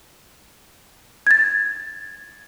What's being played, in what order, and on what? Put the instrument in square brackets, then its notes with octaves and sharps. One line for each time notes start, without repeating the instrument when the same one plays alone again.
[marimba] G#6 A6